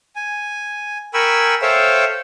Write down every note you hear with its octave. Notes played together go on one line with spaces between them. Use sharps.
G#5
A#4 G5 G#5 B5 C#6 E6
A4 C5 C#5 E5 F5 G5